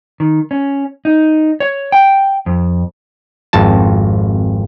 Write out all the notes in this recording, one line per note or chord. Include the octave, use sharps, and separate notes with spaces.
D#3
C#4
D#4
C#5
G5
F2
G#1 F2 A5